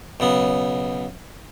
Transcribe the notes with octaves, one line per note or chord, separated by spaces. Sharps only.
B1 C#3 B3